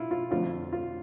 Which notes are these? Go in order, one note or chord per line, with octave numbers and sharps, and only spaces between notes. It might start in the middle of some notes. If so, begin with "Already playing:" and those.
Already playing: E4 F4
F4
F2 D3 A3 C4 F4
F4